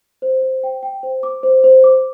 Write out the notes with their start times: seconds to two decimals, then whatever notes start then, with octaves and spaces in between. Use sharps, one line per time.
0.22 C5
0.42 C5
0.63 G5
0.83 G5
1.03 C5
1.23 D6
1.43 C5
1.64 C5
1.84 D6